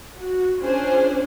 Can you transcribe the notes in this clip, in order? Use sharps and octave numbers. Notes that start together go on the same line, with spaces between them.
F#4
C#4 D4 F4 G#4 C5